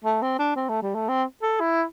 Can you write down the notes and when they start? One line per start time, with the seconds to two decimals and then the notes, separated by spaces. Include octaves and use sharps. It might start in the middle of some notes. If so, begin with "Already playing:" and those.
0.04 A3
0.22 C4
0.39 D4
0.56 C4
0.69 A3
0.82 G3
0.95 A3
1.08 C4
1.42 A4
1.60 E4